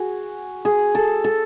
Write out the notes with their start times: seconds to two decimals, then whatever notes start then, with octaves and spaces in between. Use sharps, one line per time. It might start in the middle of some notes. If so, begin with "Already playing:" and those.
Already playing: F#4 G#4
0.65 G#4
0.95 A4
1.24 A4